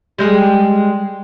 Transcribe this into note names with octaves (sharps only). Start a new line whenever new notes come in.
G3 G#3 G#4